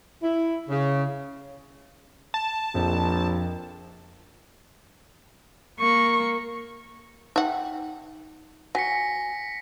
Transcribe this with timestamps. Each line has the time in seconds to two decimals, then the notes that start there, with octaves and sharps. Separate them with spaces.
0.23 E4
0.69 C#3
2.34 A5
2.75 A#1 F2
5.80 A#3 C#6
7.36 D#4 E5 F#5 G5
8.75 F#3 F#5 G#5 A#6 B6 C#7